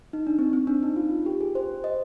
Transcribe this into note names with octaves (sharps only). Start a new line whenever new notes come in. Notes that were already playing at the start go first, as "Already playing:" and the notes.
D#4
D4
C4
C4
D4
D#4
F4
G4
G#4
C5
D#5